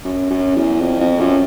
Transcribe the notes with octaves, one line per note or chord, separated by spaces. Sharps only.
F#2
F#2
E2
F2
F2
F#2